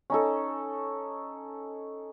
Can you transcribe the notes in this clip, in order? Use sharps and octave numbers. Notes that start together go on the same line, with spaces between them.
C#4 D#4 A4